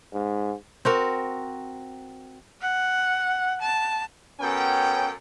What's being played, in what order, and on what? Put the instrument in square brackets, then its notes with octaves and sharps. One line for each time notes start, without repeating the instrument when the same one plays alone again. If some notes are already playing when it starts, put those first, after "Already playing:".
[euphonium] G#2
[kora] C4 F#4 A#4
[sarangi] F#5
A5
[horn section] F#2 B3 C#4 A4 G5